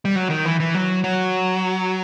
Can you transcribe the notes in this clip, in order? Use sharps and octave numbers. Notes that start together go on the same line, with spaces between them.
G3
F#3
D#3
E3
E3
F#3
F#3